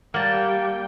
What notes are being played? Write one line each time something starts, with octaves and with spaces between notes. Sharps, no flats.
G3 A#3 F#5 G5 A5